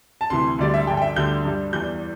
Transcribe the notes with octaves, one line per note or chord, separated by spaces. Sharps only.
A5
D2 C3 E3 C6
D2 D3 G3 D5
E5
G2 D3 G3 G5
G5
E5
D2 D3 G3 G6
G2 G3
E2 E3 G3 G6